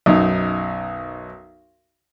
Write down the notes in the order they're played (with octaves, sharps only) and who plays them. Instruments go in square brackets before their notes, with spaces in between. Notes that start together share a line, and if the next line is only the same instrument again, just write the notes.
[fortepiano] B1 F#2 D#4